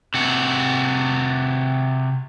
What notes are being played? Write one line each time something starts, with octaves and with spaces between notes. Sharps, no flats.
C3 F#4